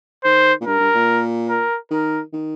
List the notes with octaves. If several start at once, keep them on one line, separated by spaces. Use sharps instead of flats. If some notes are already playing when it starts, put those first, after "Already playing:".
D#3 C5
A#2
G2 A#4
G2
A#2
A#4
D#3 A#4
D#3